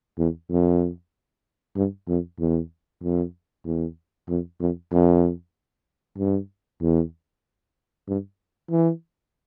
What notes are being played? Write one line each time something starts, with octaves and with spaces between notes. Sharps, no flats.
E2
F2
G2
F2
E2
F2
E2
F2
F2
F2
G2
E2
G2
E3